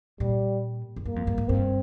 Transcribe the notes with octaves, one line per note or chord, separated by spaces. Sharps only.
A#2 G3
F2
G2 A#3
F2
G2
G#2
G2 C4